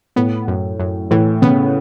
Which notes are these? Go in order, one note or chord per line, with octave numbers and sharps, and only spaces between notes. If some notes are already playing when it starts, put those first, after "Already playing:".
A2 B3
F#2
F#2
A2 E3
C#3 B3